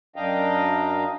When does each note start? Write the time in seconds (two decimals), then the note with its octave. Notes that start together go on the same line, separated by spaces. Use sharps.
0.16 F#2 D4 D#5 F5 G5 A#5